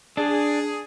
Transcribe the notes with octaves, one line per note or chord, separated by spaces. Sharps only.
D4 G#4